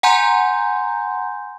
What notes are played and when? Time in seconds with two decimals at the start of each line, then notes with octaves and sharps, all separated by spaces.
0.03 F#5 G#5 A#5 C6 G6